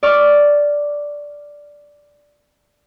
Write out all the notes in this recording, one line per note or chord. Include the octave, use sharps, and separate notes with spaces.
D5 C#6 F6